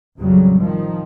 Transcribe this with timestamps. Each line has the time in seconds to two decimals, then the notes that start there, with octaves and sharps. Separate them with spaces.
0.19 A1 F2 C#3 F#3 G3
0.58 D#3 F3